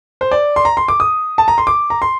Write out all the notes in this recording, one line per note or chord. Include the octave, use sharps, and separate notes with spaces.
C5
D5
C6
A#5
C6
D6
D#6
A5
A#5
C6
D6
A#5
C6